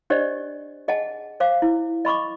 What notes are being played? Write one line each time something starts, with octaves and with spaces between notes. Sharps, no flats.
D4 G4 C5 D5 D#5
G#4 D#5 F#5 G#5 A5
C5 F5 D6
E4
D#5 B5 C#6 D6